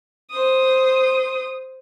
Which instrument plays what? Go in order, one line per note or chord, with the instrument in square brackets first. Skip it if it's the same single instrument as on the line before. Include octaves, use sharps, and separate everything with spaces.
[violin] C5 D#6